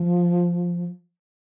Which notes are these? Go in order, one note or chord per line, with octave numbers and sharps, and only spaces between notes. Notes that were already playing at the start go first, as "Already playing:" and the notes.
Already playing: F3